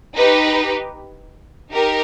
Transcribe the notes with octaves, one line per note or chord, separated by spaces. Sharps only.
D#4 G4 B4
D#4 G4 A#4